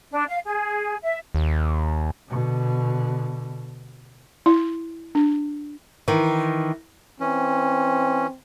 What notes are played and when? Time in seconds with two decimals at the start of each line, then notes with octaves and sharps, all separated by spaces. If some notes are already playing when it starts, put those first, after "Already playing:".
0.12 D4
0.28 F5
0.44 G#4
1.03 E5
1.35 D#2
2.30 B2 D3
4.46 E4
5.15 D4
6.08 D#3 E3
7.20 E3 C4 C#4